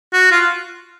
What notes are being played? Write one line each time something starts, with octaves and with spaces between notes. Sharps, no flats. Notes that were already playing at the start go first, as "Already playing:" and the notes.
F#4
F4